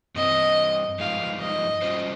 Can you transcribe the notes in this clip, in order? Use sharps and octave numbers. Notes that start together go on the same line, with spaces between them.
G2 G3 C4 D#5
G2 F3 G#3 D#4 F5
D#5
G3 C#4 F4 C5